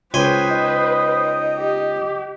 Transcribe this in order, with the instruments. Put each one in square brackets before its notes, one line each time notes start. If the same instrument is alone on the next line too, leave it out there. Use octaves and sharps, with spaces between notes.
[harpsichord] C#2 G#5 C6 [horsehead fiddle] B4 C5 [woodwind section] G5 D#6
[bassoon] D#4
[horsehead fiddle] G4